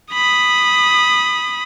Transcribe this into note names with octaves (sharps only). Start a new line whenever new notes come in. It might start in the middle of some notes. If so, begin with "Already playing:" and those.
B5 D#6